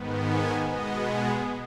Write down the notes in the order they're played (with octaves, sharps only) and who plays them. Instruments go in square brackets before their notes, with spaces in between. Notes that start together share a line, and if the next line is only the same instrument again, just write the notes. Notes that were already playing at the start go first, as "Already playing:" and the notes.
Already playing: [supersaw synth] G#2 D#3 B3
G#5
B2 G#3 B3 D#5
G#4